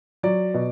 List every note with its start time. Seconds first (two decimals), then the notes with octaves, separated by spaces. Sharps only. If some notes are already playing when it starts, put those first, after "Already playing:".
0.23 F#3 D5
0.54 B2